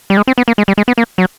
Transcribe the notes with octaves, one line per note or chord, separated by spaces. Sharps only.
G3
G#3
C4
B3
A#3
G#3
G3
G#3
B3
A#3
F#3